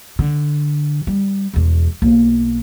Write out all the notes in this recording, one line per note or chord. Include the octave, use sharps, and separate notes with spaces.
D3
G3
E1 E2
B1 A#3